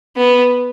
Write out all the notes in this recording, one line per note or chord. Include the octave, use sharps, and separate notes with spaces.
B3